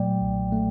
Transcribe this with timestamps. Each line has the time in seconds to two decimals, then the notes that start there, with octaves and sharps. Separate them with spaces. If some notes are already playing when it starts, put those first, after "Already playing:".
Already playing: A#2 F#3 A3 D5 G5
0.21 B1
0.52 A3